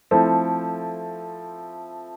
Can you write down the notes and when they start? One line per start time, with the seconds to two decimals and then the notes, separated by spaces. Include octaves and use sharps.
0.11 F3 A3 C4 E4 A4